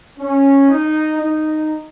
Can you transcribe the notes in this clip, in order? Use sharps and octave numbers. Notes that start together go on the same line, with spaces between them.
C#4
D#4
D#4